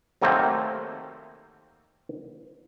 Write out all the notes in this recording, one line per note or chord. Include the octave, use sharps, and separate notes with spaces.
C3 D#3 F#3 A3 A#3 C4